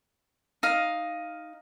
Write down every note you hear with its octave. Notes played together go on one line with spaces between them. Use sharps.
D#4 F5